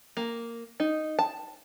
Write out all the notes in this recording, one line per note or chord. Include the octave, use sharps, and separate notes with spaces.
A#3
D#4
A5